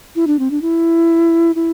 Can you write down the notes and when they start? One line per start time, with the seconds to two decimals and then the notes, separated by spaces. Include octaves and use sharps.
0.16 E4
0.27 D4
0.39 C4
0.51 D4
0.62 E4
1.56 E4